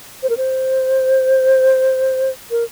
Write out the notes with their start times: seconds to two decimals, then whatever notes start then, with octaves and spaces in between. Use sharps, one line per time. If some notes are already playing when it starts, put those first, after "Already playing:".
0.23 C5
0.30 A#4
0.37 C5
2.51 A#4